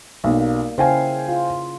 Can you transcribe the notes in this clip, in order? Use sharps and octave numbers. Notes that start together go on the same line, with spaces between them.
B1 G3 A#3
C#3 E4 C5 F5 G5 G#5
F4